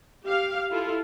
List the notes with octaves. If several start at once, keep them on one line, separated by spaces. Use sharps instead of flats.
G4 F5
E4 F4 A4